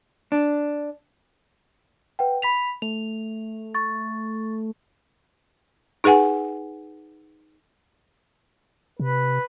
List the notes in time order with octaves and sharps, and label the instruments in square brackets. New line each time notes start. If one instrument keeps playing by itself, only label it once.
[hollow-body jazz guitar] D4
[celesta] B4 F#5 G5
B5 B6 F7
[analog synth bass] A3 [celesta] F7
[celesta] C#6 A6
[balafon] D#4 G#4 B4 F#5 G#5
[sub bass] C3 [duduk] B4